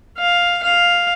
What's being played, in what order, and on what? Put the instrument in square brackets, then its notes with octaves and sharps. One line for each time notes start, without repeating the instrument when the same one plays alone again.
[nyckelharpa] F5
F5